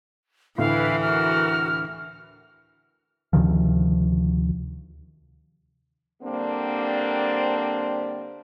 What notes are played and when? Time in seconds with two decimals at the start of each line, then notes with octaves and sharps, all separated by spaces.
0.58 D2 A2 E3 E4 B4 F5
1.02 F#4 A#4 F6
3.33 D2 C3 D#3 F3
6.22 D3 G3 A#3 C4 D4